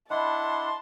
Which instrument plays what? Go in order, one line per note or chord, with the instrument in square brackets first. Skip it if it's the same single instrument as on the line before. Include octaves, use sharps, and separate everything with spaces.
[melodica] D4 E4 F#5 [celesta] D#5 E5 B5 [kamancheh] A5 [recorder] C6